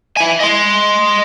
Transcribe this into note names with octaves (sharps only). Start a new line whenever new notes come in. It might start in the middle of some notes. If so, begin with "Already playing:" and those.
E4 G#5
D#5 C6